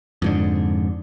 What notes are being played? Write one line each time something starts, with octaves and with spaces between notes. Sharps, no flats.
F2 G#2 D3